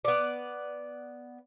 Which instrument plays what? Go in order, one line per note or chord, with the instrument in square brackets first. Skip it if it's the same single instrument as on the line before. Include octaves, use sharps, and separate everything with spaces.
[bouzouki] B3 D5